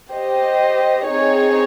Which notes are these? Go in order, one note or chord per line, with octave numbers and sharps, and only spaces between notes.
G4 C5 D#5
C4 D#4 G#4 C#5